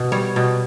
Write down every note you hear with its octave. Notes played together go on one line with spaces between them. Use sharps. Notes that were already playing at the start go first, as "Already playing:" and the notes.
Already playing: B2
G3 C#5
B2